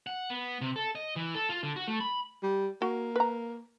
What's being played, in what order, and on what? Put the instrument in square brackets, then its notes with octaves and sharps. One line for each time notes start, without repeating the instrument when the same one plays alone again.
[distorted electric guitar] F#5
B3
C3
A4
D#5
E3
A4
F4
D3
F#4
A3
B5
[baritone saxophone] G3
[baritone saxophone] A#3 [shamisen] F#4
[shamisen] B4 A#5